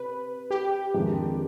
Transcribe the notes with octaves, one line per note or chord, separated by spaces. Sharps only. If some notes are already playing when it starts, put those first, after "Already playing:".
Already playing: C3 B4
G4
F2 D#3 G#3 D4 G#4